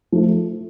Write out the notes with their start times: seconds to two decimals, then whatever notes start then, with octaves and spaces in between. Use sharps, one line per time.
0.12 F3 A3